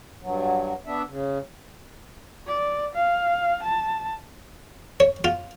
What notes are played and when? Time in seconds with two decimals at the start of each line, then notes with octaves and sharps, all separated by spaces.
0.22 G2 F#3
0.86 B3 D4 E5
1.09 C#3
2.47 D5
2.95 F5
3.63 A5
5.00 C#5
5.24 F4